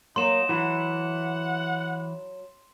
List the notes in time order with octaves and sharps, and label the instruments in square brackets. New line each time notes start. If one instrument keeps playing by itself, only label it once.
[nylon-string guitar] F#3 A#3 [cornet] D#4 [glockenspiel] C6 E7
[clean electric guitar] E3 [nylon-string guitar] F#3 [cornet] F#5